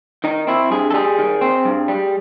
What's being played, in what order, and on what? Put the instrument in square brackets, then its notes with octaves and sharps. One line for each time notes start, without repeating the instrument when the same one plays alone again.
[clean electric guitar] D#3 D#4
C4 E4
G2 G#4
A4
G3 G#4
D#3
C4
G2
G3